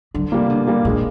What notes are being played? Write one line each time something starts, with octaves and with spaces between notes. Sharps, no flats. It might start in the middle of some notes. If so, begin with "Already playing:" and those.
D3 F#3
C3 G3 A#3
B2 D3
G3 A#3
A#2 G#3